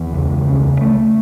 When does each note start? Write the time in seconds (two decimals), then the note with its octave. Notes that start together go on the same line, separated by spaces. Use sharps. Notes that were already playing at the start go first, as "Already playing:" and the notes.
Already playing: E2
0.13 C#2
0.47 C#3
0.81 A3